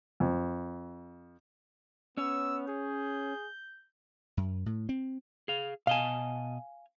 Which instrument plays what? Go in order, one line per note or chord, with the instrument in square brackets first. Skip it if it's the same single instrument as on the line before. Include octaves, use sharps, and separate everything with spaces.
[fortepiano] F2
[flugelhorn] B3 [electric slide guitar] C#4 C#5 [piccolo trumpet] E6
[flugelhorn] G#4 [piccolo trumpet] G6
[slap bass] F#2
A2
C4
[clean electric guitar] G#4 F5
[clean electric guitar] B2 D#5 A5 [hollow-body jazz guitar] F5 G#5